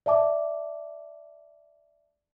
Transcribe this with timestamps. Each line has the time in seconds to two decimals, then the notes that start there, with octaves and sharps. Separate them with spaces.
0.06 D5 E5 A5 D6